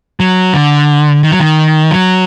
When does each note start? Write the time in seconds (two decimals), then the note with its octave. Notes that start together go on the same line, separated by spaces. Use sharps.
0.20 F#3
0.54 D3
1.23 D#3
1.32 F#3
1.40 D#3
1.91 F#3